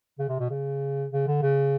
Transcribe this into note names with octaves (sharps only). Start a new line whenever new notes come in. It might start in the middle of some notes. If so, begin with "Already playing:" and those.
C#3
C3
B2
C#3
C#3
D3
C#3